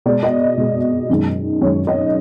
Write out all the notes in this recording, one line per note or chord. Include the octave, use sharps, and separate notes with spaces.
B2 G#3 D5
D#5
B2 G#3
F#2 D#3 G#3
F#2 D#3 G#3 C#5
D#5